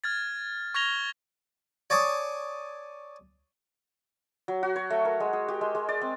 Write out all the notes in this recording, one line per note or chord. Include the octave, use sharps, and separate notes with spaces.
F6 G#6 A6
C#6 F6 G#6 A#6 F7 G7
C#5 D5 G#5 A5 C#6 D#6
F#3
F#4
C#5
A3
A#4
G#3
G#4
G4
G#3
G#3
D5
C4